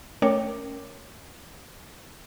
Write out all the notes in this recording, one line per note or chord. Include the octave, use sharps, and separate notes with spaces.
A3 C#4 A#4 C#5 G5 D6